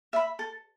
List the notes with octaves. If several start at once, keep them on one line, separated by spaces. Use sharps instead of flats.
E5 B5
A4